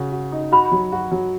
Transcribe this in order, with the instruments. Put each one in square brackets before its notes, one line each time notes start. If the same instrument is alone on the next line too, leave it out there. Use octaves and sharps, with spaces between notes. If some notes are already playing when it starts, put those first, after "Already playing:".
Already playing: [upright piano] C#3 F#4
F#4
D#4
[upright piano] F#4 [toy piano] B5
[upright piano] F#3
F#4
F#3